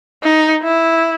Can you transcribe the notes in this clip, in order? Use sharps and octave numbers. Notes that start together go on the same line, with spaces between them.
D#4
E4